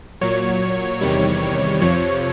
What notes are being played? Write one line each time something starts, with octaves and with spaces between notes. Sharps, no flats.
A#2 F#3 C#5
E2 C3 D#3 G3
F2 C3 F3 C#5